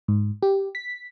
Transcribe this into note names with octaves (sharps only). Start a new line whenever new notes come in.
G#2
G4
B6